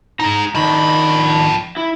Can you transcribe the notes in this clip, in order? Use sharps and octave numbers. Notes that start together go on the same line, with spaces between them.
D#4 G#4 A#5
D#3 F3 D4 B5
E4